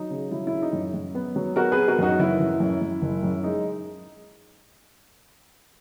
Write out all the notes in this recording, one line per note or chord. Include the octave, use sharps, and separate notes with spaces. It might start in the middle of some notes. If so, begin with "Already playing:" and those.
Already playing: F#3 D#4
C#3
F#3 E4
E4
C#3
D#4
F#2
F#2
B3
F#3
B3 F#4 A#4
G#4 B4
B3
F#4 A#4
F#2 D#4 F#4
F#1 E4
F#1
F#2
F#2
F#1
F#2
G#3 D#4